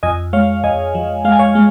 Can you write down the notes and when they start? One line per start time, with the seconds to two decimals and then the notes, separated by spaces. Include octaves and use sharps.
0.03 F2 D#5 G#5
0.33 G#3 C#5 F5
0.64 F2 D#5 G#5
0.95 F3
1.25 G#3 F5
1.32 G#5
1.39 C#5 F5
1.55 G#3